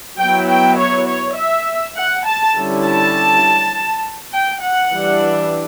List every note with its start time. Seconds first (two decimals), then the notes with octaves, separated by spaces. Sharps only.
0.19 F#3 B3 E4 G5
0.49 G5
0.78 C#5
1.08 C#5
1.37 E5
1.96 F#5
2.26 A5
2.55 D3 G3 C#4 E4
2.85 A5
4.33 G5
4.63 F#5
4.92 E3 G3 D4